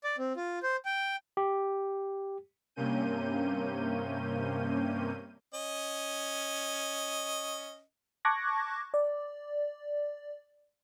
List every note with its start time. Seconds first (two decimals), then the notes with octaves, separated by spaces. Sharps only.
0.04 D5
0.18 C4
0.36 F4
0.63 C5
0.85 G5
1.37 G4
2.76 G2 C3 A#3 C#4 G6 D#7
5.54 C#4 D#5
8.25 A5 C#6 D6 F#6 G#6 A#6
8.94 D5